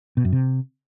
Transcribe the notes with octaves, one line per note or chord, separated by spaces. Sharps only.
B2
F#2
C3